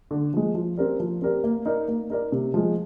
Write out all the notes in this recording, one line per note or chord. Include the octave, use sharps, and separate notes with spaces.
D3
F3 G#3
F3
C4 G4 A#4 D5
F3
C4 G4 A#4 D5
A#3
D#4 A#4 D5
A#3
D#4 A#4 D5
C3
F3 G#3